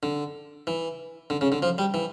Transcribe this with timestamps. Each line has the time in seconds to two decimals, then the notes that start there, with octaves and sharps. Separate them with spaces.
0.03 D3
0.67 E3
1.30 D3
1.41 C#3
1.52 D3
1.62 F3
1.78 G3
1.94 E3